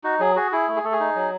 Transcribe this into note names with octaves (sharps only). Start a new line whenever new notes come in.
D#4 F#4
F#3 G#4
F#4 G#4
E4 G#4
A3
G#4
A3 A4
G#4
D#4
F#3